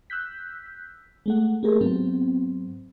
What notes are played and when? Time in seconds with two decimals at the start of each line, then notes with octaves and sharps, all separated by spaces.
0.10 E6 F#6 G6 B6
1.26 G#3 A3 F#5
1.63 A3 A#3 G4 G#4 A#4
1.81 G#2 F#3 B3 C4